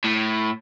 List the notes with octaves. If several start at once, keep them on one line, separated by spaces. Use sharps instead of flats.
A2